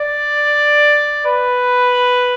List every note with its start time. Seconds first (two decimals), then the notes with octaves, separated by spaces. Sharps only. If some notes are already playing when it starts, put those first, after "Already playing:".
Already playing: D5
1.26 B4